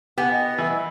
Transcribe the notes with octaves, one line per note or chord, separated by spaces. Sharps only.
B3 G4 F#5 G#5
D#5
E3 E4